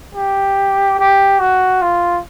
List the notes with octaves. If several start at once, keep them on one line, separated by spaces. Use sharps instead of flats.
G4
G4
F#4
F4